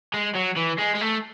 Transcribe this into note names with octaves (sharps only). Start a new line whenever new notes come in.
G#3
F#3
E3
G#3
G#3
A3